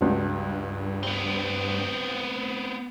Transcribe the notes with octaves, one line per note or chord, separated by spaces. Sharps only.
C#2 G2 D4 F#4
B3 C4